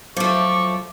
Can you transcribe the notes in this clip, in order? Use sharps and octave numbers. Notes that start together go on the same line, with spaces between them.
F3 F#3 A3 C#6 D6